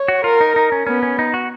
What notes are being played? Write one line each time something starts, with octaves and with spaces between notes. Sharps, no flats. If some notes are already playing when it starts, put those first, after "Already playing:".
Already playing: C#5
F#4
F4 A#4
D#4
D#4
C#4
B3 C#4
C#4
D#4
F#4